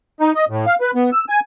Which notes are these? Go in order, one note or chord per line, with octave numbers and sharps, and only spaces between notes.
D#4
D#5
A2
F5
B4
B3
E6
G#5